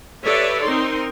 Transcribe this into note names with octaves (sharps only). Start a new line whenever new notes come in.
G4 A4 B4 C#5 D5 E5
C4 D#4 A#4 C6